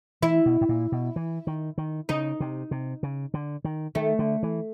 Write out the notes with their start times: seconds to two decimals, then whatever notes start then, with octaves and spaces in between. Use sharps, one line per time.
0.22 E3 E4
0.46 B2
0.61 A2
0.69 A#2
0.92 B2
1.16 E3
1.47 D#3
1.78 D#3
2.09 C#3 D#4
2.40 C3
2.71 C3
3.03 C#3
3.34 D3
3.64 D#3
3.95 D#3 A3
4.19 D3
4.43 E3